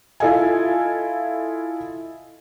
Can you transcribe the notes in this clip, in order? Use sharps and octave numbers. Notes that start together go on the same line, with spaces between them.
E4 F4 A4 D#5 F5 G#5